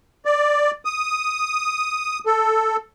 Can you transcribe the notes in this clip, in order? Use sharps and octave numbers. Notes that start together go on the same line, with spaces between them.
D5
D#6
A4